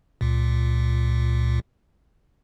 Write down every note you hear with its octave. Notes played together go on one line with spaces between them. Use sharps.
C#2 A#2